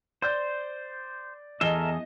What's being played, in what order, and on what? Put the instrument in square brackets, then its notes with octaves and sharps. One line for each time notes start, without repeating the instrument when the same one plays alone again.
[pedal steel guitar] C5 [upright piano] D5 G6
[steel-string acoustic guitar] E2 [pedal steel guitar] A4 A#4 E5 [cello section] D#5 [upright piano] G7